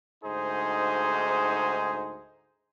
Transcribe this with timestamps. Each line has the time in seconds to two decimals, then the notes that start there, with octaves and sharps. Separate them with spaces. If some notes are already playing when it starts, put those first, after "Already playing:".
0.23 D2 G#2 D#4 G#4 C5